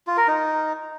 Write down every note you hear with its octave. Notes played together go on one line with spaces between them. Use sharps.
F4
A#4
D#4